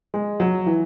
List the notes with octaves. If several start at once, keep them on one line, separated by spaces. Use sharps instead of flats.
G#3
F#3
E3